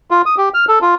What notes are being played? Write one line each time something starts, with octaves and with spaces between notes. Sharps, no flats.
F4
D#6
G4
F6
A4
F4